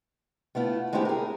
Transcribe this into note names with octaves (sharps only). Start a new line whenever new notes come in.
A3 B3 E4 F4
G#3 A3 C4 E4 G4 G#4
G#4 A#4